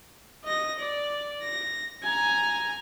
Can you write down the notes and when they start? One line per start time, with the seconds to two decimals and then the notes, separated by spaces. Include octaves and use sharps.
0.44 D#5 A#6
0.79 D5
1.42 A#6
2.03 G#5 A#5